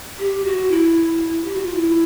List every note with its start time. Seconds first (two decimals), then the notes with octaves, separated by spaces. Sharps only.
0.19 G4
0.45 F#4
0.71 E4
1.45 G4
1.55 F#4
1.65 F4
1.75 E4